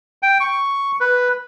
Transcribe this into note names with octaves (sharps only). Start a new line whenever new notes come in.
G5
C#6
B4